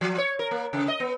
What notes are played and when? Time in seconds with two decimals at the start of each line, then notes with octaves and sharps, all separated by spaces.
0.01 F3
0.18 C#5
0.39 A#4
0.51 A#3
0.73 C#3
0.88 D#5
1.00 B3